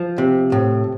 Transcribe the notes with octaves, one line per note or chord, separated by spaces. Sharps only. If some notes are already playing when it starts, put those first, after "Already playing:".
Already playing: F3
C3
A2